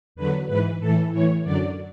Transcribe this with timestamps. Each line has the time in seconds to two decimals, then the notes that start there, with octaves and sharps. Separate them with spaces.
0.15 E2 D3 F#3 B4
0.48 G#2 E3 B4
0.80 A2 E3 A4
1.12 A2 E3 C#5
1.44 F#2 D3 F#3 D5